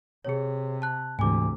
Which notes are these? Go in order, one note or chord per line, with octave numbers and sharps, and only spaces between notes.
C3 G#4 C#5
A5 F#6
D2 G#2 C3 E3 G#5 D6